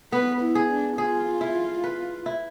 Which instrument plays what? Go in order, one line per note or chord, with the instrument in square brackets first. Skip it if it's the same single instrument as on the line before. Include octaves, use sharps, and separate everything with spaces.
[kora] B3 [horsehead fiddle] B4
[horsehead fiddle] E4
[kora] G#4
[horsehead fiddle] D4
[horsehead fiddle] F4 [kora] G#4
[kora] E4
B4
E4